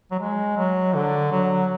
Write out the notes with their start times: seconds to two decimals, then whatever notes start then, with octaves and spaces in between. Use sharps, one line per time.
0.11 F#3
0.19 G#3
0.57 F#3
0.94 D3
1.32 F#3